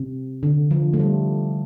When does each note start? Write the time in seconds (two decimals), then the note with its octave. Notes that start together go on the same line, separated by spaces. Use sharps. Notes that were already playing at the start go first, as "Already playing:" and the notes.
Already playing: C3
0.43 D3
0.71 F3
0.93 A3
0.99 G3